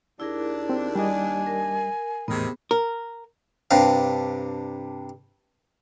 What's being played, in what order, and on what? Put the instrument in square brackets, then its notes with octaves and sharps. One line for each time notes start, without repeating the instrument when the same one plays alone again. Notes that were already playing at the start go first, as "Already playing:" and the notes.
[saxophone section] D#2 D4 [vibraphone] E4 G#4 A#4
[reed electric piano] C4
[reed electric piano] G3 D#5 [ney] G#5
[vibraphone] A#4
[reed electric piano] E2 A2 [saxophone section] C3 D#3 [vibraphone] B3 G#4
[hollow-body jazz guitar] A#4
[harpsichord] G2 C3 D4 F5